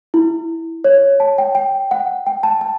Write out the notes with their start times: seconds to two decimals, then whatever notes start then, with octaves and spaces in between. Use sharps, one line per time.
0.14 E4
0.84 C#5
1.20 A5
1.38 G5
1.55 G5
1.91 F#5
2.27 G5
2.43 A5
2.61 A5